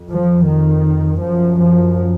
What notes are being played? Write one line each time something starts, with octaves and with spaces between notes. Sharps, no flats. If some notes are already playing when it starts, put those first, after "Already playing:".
Already playing: F2
F3
D#3
F#2 F3
F3